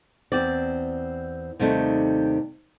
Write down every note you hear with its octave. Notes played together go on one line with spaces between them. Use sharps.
E2 C4 D5
D#2 C3 G3 A3 D#4